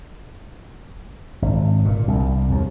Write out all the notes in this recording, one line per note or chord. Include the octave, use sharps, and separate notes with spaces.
G#1
A#2
C2
D#2